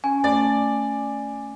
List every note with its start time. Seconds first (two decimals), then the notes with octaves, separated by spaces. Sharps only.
0.04 C#4 G#5
0.24 A3 D5